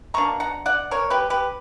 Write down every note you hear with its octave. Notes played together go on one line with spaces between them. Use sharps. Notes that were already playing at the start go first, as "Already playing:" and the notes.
B2 A#3 D4 A#5 C#6
F#5 A#5
D5 F#5
A#4 C#5
G4 B4
G4 B4